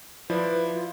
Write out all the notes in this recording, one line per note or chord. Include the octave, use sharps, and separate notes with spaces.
F3 E4 B4 D5
F4